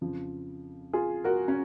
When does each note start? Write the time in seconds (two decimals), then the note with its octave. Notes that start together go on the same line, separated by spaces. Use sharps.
0.01 F2 C#3 F3
0.93 F4 G#4
1.24 F#4 A#4
1.48 C#4